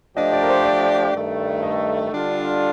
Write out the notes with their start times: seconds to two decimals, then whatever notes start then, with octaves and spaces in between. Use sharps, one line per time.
0.17 F3 A3 D4 G4 D#5
0.33 D5
0.42 A#4
0.49 C5
0.65 D5
1.14 G2 D#3 A3
1.63 D#5
2.12 D3 G3 D4 F4 A4